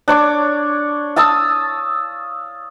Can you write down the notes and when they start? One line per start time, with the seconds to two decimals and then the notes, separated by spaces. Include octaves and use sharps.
0.08 D4 C#5 D6
1.16 F5 A5 D#6 E6